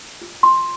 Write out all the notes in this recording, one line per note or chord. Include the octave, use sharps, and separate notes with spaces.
F4
F4 C6